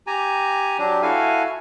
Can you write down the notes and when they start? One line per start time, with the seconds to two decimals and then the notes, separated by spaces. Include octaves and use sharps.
0.07 G4 G#5 A#5
0.79 F#3 D4 G4
1.02 E4 F#4 A4 F5 G#5